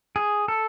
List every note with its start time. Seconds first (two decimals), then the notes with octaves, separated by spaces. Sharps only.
0.16 G#4
0.48 A4